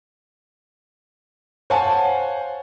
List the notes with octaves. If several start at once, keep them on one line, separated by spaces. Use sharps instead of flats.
C5 C#5 F5 F#5 G#5 A5